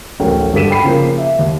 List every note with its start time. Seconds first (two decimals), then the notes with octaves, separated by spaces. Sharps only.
0.20 D1 A1 A3 C#4 A#4 G5
0.54 G2 D3 A4 B6 D#7 E7
0.70 G5 B5 C7 D#7
0.83 C#3 F3 A#3
1.18 E5
1.39 D#2